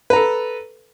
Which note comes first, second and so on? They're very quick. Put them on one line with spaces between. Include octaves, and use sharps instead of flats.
B4 A#5 A4